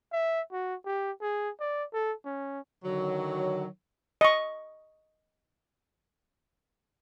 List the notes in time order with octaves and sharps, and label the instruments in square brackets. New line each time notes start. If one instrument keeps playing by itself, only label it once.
[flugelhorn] E5
F#4
G4
G#4
D5
A4
C#4
[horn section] D3 D#3 F#3
[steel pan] D#5 C#6